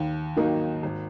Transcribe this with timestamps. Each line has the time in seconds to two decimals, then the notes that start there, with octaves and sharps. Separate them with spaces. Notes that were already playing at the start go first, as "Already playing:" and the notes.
Already playing: D#2
0.36 D#3 F#3 A#3 D#4
0.83 G#1